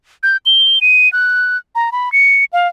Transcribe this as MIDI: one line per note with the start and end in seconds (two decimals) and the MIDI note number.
0.23 0.37 91
0.46 0.79 103
0.81 1.11 99
1.13 1.57 90
1.75 1.90 82
1.92 2.12 83
2.12 2.44 97
2.53 2.68 77